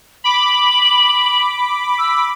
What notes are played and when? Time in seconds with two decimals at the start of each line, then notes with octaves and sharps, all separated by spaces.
0.24 B5 D6 F#7
1.98 E6